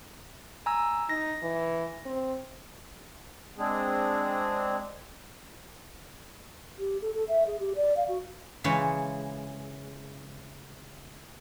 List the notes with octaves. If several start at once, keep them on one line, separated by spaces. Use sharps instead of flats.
G#5 A#5 E6
D#4 A#6
E3
C4
G#3 C4 D4 G#4
G4
A4
A4
E5
G#4
G4
D5
F5
F#4
C#3 E3 G#3 C#5